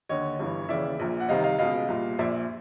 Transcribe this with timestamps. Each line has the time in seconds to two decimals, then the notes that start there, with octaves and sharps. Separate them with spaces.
0.09 D#2 D3 C#5 D#5
0.39 G1 G2 E3
0.69 D#2 C#3 E3 D5 E5
0.99 A#1 A#2
1.20 F#5
1.29 C2 C3 D#3 D#5 F5
1.44 D#5 F5
1.59 C#2 B2 D#5 F5
1.88 C2 A#2
2.19 A#1 A#2 D5 E5